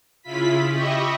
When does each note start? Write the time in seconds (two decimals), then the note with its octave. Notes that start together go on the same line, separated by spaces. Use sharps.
0.23 C#3 E4 F4 B5 B6
0.71 G4 D#5 E5 B5 C#6